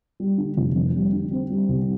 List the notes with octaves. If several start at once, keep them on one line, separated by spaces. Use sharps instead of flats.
G3
D3
F1
F2
G3
D3
C4
G3
C2